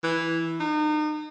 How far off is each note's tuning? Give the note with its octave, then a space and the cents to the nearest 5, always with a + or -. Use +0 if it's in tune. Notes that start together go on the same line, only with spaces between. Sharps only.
E3 +0
D#4 -35